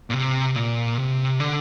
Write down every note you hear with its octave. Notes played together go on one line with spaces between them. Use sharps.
A#2
C3
A#2
C3
D3